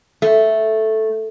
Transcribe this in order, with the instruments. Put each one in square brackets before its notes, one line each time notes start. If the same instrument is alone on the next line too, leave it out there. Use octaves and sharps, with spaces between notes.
[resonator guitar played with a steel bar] A3